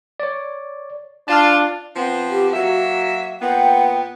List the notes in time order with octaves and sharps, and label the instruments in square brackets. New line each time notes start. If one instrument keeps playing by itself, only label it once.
[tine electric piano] C#5 D5
[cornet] D4 [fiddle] F4 [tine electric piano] A5 F6
[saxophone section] F3 B3 C4
[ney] G4
[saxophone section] F#3 A#3 E5 [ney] F#4
[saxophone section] A#2 B3 [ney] G5